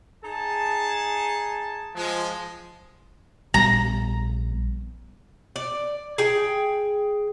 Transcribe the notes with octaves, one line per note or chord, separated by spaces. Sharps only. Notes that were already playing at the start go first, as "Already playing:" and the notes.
D#4 G#4 A5
F3 G#3
A#1 G3 B3 A#5
D5
G#4 G5